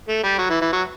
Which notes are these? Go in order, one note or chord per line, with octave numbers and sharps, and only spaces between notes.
A3
G3
F#3
E3
E3
F#3